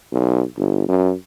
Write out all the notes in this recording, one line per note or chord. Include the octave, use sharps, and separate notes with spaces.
B1
G1
F#2